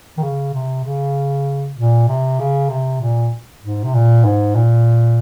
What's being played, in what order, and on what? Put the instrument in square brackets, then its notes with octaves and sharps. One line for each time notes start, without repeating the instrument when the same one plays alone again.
[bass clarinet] D#3
C#3
C3
C#3
A#2
C3
C#3
C3
A#2
G#2
C3
A#2
G#2
A#2